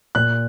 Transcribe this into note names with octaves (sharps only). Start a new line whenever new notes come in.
A#2 F#6